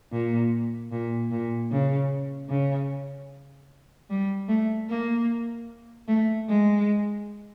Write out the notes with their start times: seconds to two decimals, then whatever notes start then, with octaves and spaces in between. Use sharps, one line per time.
0.12 A#2
0.92 A#2
1.31 A#2
1.72 C#3
2.50 C#3
4.10 G3
4.49 A3
4.89 A#3
6.08 A3
6.49 G#3